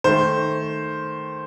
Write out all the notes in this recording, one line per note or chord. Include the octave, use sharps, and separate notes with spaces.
D#3 A3 C5